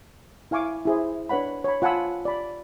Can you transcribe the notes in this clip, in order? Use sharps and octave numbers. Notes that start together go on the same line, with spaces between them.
E4 F5 G#5 C#6 D6
E4 G#4 C5
D4 B4 C#5 F#5 B5
C#5 B5
F4 F#5 G#5 A5 B5 E6
D5 B5